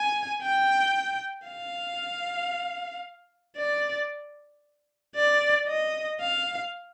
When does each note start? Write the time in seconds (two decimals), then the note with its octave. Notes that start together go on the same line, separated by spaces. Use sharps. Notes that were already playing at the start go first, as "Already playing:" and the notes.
Already playing: G#5
0.43 G5
1.48 F5
3.57 D5
5.16 D5
5.68 D#5
6.21 F5